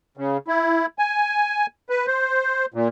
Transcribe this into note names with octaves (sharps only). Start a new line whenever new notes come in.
C#3
E4
G#5
B4
C5
A#2